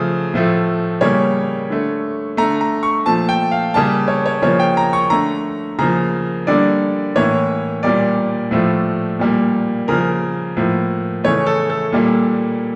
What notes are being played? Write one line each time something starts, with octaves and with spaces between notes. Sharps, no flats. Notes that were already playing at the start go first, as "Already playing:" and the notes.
Already playing: C#3 F3 A3
A2 F3 A3
C#3 G3 A#3 C#5
D3 A3
D3 A3 A#5
A#5
C#6
A#2 F3 A3 A5
G5
F5
C#3 G3 A#3 A5
C#5
C#5
C#3 F3 A#3 C#5
G5
A#5
C#6
D3 A3 A#5
C#3 F3 A#3 A#5
D3 G3 A#3 D5
A2 E3 A#3 C#5
A#2 G3 A#3 D5
A2 F3 A3
A#2 G3 A#3
C#3 F3 A#3 A#4
A2 F3 A#3
C#3 E3 A3 C#5
A4
A4
A#2 G3 A#3